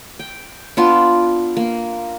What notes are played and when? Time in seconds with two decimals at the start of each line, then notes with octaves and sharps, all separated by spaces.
0.19 G5
0.77 B3 D4 F4
1.57 A#3